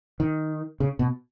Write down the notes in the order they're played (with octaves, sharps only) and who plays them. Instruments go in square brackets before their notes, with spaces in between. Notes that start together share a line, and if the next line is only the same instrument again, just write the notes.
[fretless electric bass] D#3
C#3
B2